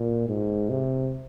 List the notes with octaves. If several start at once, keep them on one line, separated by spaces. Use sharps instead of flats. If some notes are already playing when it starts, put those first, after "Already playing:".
Already playing: A#2
G#2
C3